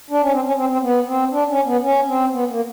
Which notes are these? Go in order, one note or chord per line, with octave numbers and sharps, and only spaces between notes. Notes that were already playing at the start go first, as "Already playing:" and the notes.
D4
C#4
C4
C#4
C4
C4
B3
C4
D4
C#4
B3
C#4
C4
B3
A#3